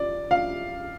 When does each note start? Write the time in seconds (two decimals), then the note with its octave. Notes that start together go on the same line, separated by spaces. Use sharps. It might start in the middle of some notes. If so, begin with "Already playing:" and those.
Already playing: D5
0.31 F5